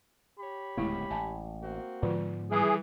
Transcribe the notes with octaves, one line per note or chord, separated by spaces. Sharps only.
G4 C#5 B5
D1 C#2 G#3 A3 B3 E4
A1 G#5 A5
A#3 C4 F#4
G#2 D3 F3 G#3 B3 F4
E3 G3 G#4